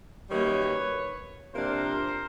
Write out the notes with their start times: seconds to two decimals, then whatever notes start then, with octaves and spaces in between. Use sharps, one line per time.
0.29 F#2 D#3 G3 A#3 B4 C#5
1.53 C3 F3 A#3 D4 A#4 C5